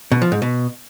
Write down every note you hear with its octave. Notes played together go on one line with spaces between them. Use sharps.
B2
F3
G#2
B2